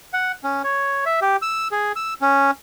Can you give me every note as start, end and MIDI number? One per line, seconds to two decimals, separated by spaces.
0.13 0.32 78
0.44 0.62 61
0.64 1.04 73
1.06 1.20 76
1.22 1.37 67
1.42 1.68 88
1.72 1.92 68
1.96 2.14 88
2.21 2.51 61